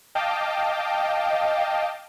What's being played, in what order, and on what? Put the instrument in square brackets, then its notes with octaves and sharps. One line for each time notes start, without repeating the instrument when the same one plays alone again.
[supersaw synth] D#5 F5 G5 A5 D6